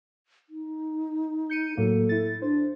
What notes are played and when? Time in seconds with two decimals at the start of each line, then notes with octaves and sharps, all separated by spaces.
0.50 D#4
1.50 G6 C#7 D#7
1.77 A2 F#3 A#3 A4
2.09 E4 A6
2.42 D4 C5